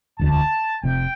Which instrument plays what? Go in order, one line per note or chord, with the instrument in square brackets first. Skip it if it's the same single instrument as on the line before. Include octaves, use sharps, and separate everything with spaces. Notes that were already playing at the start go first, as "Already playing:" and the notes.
[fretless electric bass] E1 D2 D3 [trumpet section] A5
[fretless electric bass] F1 F2 C3 [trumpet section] G5